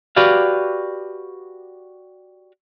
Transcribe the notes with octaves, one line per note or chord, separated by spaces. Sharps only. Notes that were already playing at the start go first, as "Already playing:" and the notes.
F#4 G4 B4 D5 F5